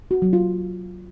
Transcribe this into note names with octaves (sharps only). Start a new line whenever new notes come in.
F#4
F#3
F4